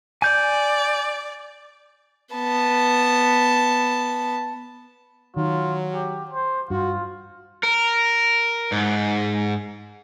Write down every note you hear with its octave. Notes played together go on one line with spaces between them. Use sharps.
D5 G#5 G6
B3 A5
D#3 F#3 F4
G4
C5
G2 F4 F#4
A#4
G#2